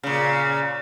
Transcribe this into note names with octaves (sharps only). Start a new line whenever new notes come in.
A#2 C#3